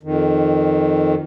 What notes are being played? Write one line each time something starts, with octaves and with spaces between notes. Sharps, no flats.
F2 D#3